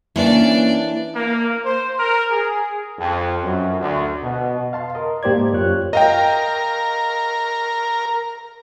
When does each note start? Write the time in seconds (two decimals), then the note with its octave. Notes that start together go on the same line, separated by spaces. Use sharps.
0.16 E3 A#3 C#4 D4 D5
1.16 A#3
1.65 C5
1.98 A#4
2.31 G#4
2.99 F2
3.44 F#2
3.80 D2
4.22 B2
4.73 F5 A5 C6
4.95 A#4 D#5
5.23 G#2 A#3 G4 C5 D5 G#6
5.53 F#2 F4 G4 C#5 F#6
5.93 A#4 D#5 F5 G5